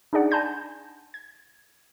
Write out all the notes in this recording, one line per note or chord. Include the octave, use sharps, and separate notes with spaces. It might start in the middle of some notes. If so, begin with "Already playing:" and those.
D4 D#4 G#4 D5 F#5
G#5 A5 B5 C6 G6 A#6
G#6